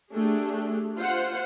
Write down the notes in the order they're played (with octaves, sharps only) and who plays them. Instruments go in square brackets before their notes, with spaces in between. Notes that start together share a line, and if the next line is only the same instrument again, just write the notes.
[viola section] A3 D4 G4 G#4
F4 C5 F#5